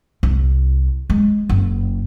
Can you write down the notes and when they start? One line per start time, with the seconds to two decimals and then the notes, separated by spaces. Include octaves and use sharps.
0.23 C2
1.10 G#3
1.49 F#1